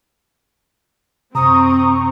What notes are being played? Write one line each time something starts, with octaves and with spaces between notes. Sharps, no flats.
F#2 C3 C4 A#5 C#6 D#6